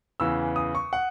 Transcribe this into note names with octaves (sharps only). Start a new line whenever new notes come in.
E2 C#3 E3 E6
D#6
C#6
F#5